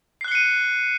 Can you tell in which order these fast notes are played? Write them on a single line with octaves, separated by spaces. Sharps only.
C7 F#6 G7 C#7 D#7